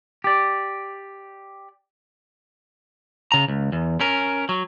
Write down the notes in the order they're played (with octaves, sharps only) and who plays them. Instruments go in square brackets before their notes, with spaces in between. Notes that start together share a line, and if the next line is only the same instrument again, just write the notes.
[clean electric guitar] G4 D5
[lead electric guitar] C#3 A#5
C#2
E2
C#4 A#4
F#3